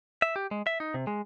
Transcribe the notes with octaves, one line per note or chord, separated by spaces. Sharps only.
E5
G4
G#3
E5
D#4
C3
G#3